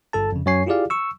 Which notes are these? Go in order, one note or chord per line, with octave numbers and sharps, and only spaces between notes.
G1 G2 A4 A5
F2 C#3
F#2 F#3 C#5 G#5 C7
E4 F4 G4 G#4 D5 F5
C#6 E6